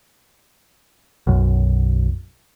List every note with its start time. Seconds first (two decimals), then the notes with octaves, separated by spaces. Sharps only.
1.27 B1 F#2